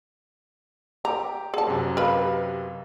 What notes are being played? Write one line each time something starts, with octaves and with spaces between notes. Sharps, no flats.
G4 A#5 D6
G#4 A5
F#2 C3
A#4 B4 D#5 F5 B5
G4